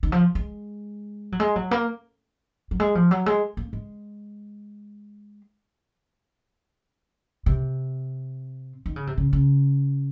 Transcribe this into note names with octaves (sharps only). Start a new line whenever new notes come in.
D#3
F3
G#3
F#3
G#3
F#3
A#3
F#3
G#3
F3
F#3
G#3
A#3
G#3
C3
D#3
C#3
C3
C#3
C#3